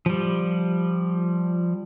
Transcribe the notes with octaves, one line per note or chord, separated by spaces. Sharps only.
F3 G3